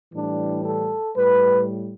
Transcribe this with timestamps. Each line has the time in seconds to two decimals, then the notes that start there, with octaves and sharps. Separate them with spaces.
0.13 A2 E3 G3 D4
0.64 A4
1.16 A2 G3 B4